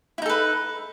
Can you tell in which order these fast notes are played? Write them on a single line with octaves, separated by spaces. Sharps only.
E4 D#4 A4 B4